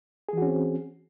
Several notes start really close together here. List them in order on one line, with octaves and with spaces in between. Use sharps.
G#4 E3 F#4 C#4 C4